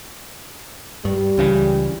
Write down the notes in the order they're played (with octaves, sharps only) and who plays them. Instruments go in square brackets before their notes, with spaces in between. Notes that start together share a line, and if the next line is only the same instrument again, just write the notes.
[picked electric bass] G2 [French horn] G3
[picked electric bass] C#2 C#3 E3